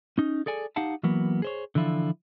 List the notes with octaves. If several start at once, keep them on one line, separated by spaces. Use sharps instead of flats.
C#4 D#4
G#4 A4 D5 G#5
D#4 G4 F5 F#5 A5
E3 F#3 A#3 B3
G#4 C5 C#5
D3 E3 F3 E4 F4